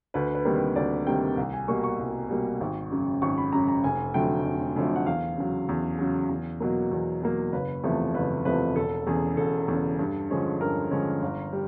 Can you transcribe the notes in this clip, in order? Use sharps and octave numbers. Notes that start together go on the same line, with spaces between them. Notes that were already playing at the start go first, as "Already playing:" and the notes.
D2 B4
B4
C3 D#3 G3 A#3
B4
D2 D5
C3 D#3 G3 A#3 G5
C2
G#5
B2 G3 A#3 C#6
C#6
C2
B2 G3 A#3
G#1
F#2 C#3
G#1 C#6
B5
F#2 C#3 A#5
A#5
F1 G#5
F2 D3 F#3 A3 G5
F1
F2 D3 F#3 A3
F#5
E2 F5
C#3 F#3
E2
C#3 F#3
E2
B2 F#3 A#3
E2
B2 F#3 A#3
F#1 B4
E2 C3 F3 A3
F#1 B4
E2 C3 F3 A3 B4
E1 A4
E2 C#3 G#4
E1 A4
E2 C#3
G2
D3 F3 G#3 C#4
G2 A#4
D3 F3 G#3 C#4
G1
G3